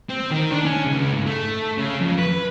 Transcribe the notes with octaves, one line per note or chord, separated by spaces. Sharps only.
C4
D#3
D4
C#4
C#2
G#2
A3
C#3
F2
B4